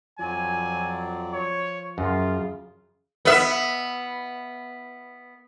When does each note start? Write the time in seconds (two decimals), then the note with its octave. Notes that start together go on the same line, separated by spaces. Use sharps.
0.19 F2 F3 F#3 D5 G#5
1.33 C#5
1.98 F#2 C#3 F4
3.25 B3 E5